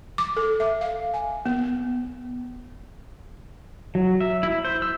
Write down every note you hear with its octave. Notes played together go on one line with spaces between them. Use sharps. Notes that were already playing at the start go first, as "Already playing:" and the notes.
D6
A4
E5
F5
G#5
B3
F#3
E5
E4
C5
E6